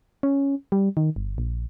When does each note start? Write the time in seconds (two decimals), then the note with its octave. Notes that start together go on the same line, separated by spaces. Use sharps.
0.23 C#4
0.72 G3
0.97 D#3
1.16 G1
1.38 A#1